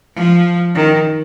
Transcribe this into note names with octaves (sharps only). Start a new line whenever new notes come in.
F3
D#3